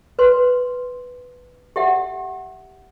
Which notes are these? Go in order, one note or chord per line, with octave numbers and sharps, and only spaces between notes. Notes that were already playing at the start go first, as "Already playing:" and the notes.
B4 C6
G4 E5 F#5